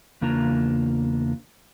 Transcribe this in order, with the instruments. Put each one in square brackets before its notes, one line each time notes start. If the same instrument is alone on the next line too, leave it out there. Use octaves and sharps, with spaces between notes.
[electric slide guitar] E2 C#3 A#3 D4 F4 A#5